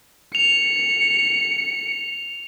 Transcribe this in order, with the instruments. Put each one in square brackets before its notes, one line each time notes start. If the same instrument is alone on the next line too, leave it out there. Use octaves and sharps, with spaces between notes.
[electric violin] C#7 [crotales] F7